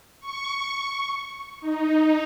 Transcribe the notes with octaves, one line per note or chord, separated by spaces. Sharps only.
C#6
D#4